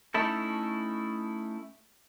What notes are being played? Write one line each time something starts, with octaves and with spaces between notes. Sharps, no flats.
A3 C#4 D#4 E4 A4